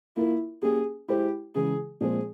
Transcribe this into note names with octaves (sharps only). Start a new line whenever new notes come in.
A#3 E4 F4 A#4
A#3 C#4 G4 G#4
G#3 E4 G4 G#4 C5
C#3 E3 G#3 G#4
A#2 F3 G#3 C4 G#4